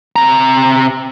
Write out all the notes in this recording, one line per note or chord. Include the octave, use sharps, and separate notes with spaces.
C3 A#5